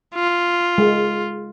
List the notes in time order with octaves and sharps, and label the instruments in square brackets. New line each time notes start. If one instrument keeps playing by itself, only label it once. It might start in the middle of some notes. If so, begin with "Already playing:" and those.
[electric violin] F4
[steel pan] G#3